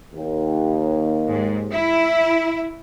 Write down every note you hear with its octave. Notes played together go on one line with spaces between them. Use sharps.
D#2
G#2
E4